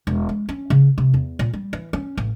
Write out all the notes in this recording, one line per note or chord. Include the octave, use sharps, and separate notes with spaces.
E1
G#3
C#4
C#3
C3
E2
A#2
G3
E3
C#4
A1